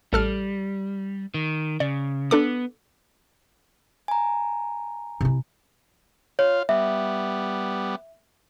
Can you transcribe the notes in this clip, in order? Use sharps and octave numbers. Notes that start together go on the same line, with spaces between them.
A1 G3 A4 F6
D#3
C#3 D5
B3 D4 A4 D6
G#5 A#5
C3 E4
F4 C#5 F5
G3 B3 E5